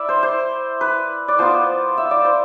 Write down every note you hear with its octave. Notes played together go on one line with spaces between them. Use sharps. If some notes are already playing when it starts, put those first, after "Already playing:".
Already playing: E4 D5 E5
C5
C5
B4
D5
F3 B3 F4 C5
E5
D5
C5